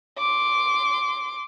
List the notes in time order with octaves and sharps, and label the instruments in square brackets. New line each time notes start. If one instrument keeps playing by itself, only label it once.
[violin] C6 D6